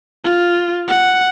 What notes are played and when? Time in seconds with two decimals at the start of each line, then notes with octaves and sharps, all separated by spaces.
0.24 F4
0.88 F#5